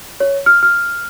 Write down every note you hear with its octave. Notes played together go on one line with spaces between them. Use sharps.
C#5
F6
F6